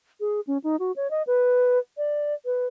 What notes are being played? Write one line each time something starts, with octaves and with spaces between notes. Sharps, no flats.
G#4
C#4
D#4
F#4
C#5
D#5
B4
D5
B4